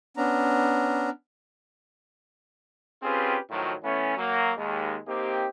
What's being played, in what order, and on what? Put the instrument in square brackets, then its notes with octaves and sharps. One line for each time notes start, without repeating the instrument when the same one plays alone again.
[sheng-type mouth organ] B3 C#4 D4 A#5
[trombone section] C4 C#4 F4 G4 G#4 B4
A2 D#3 F3 F#3
E3 A3 B3 C#4
F#3 A#3
D#2 G#3
A#3 C4 D#4 G4